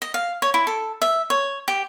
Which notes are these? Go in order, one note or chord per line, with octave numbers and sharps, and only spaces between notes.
D#5
F5
C#5
E4
A4
E5
C#5
G4